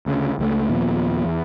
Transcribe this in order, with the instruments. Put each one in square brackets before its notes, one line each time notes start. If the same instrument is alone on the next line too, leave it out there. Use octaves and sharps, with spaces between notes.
[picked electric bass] D2 C#3
C#2 G3 A3
D#2 A#2 F3 B3
E2